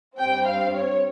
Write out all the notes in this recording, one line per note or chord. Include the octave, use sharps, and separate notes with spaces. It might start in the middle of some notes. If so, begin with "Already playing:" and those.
G2 G3 C4 G5
F5
C#5